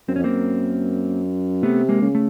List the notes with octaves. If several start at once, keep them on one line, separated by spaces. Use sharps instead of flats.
F#2 C4
F2 C#4
F#2 A#3 C4
C3 A3 B3
G#3 A#3
C#3
A3